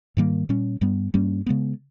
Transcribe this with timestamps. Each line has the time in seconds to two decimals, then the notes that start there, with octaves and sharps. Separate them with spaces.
0.17 G#2 D#3 G3 A#3
0.49 A#2 G3 C#4
0.81 G2 G3 B3
1.14 G2 G3 A#3 C#4
1.46 C#3 G#3 B3